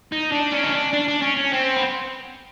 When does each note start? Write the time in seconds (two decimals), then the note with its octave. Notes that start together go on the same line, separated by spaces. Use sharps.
0.12 D#4
0.32 D4
0.52 C#4
0.63 D#4
0.73 D4
0.93 D4
1.08 D4
1.22 C#4
1.37 C#4
1.52 C4
1.76 B3